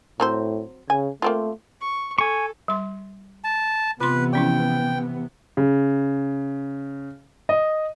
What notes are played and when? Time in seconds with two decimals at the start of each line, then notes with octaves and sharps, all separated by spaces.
0.20 A2 F#3 C4 C5
0.90 C#3 G#5
1.22 A3 A#3 C4 F4
1.81 C#6
2.18 A4 G#5 C#6
2.68 G3 C6
3.44 A5
4.00 C3 E3 B3 F4 B4 C6
4.33 F3 C#4 E4 G5
5.57 C#3
7.49 D#5